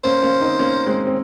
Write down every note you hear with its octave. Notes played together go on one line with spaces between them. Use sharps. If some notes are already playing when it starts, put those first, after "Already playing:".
A#3 C#4 C5
A#3 C#4
C4 D#4
A#3 C#4
G#3 C4
C4